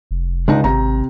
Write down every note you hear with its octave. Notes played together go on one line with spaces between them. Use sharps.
F1
C#2 G#3 D4 D#4
G#1 C3 A#5